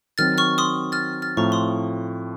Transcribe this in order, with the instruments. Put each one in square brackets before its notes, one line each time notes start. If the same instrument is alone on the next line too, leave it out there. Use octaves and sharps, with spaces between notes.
[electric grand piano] D#3 F#3 C4 [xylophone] F6 A6
[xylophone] C#6 F6
C6 D#6
F6 A6
F6 A6
[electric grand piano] A2 F3 C4 [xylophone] A#5 C#6
[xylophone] C6 D#6